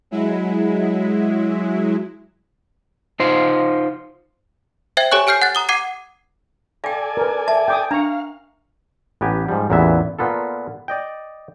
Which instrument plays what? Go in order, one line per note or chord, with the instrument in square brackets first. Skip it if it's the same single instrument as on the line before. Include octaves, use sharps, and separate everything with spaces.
[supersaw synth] F#3 G#3 E4
[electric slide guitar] D#4 F4 C5
[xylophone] C5 E5 G5 G#6
G4 A4 C#5 G#5 C#6 F#6
G4 G#5 F6 G6 C7
F#5 F#6 A6
A#5 D#6 G7
F#5 D6 G#6 C7 D#7
[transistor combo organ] A4 D5 G#5 [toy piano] F5 G5
[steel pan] A#4 B4
[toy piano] E5 A5
[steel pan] G5 D6 D#6
[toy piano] D4 [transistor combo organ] F5 [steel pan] A#5 C#6
[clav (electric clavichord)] A1 B3 G4 G#5 A#5
G#2 F3 G3
A1 E2 A#2 E3 B3 E5
A#2 A#3 B3 F4 A4
D5 D#5 G5